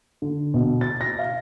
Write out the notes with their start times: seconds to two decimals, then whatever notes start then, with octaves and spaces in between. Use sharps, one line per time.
0.22 D3
0.54 B2
0.81 A6
1.01 A#6
1.19 F5